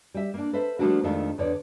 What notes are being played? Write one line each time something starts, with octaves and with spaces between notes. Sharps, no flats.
G3 E5
A#3 D4
A4 B4 C5 E5
F3 G3 A3 A#3 D4 F#4
F2 D#3 G#3 A3 D4 F4
E2 D3 C#5 D5